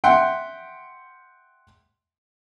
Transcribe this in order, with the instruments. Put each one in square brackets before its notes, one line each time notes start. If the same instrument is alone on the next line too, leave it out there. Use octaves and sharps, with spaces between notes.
[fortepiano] E5 F#5 G5 C6